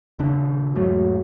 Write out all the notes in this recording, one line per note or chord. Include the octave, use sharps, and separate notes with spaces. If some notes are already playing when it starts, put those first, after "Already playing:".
D#1 C#3 D4
E2 G#2 F#3 A3